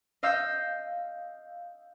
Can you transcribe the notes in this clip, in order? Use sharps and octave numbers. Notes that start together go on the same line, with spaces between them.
D#5 F5 E6 G6 C7